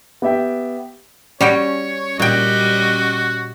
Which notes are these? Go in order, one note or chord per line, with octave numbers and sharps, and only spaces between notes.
B3 G4 E5 G5
G3 C#4 F#4 C#5 G5
A#2 G3 F#4 D#5 G5